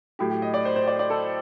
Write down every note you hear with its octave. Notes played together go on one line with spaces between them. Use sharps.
A2 F#3 G4
G4
D#5
D5
C5
C5
D5
D5
A4